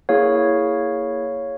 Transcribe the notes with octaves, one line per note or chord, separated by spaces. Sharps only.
A#3 E4 G#4 C#5 F5